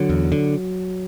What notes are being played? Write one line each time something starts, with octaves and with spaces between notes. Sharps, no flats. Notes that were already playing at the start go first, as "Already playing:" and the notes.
Already playing: D3 F#3
E2
D3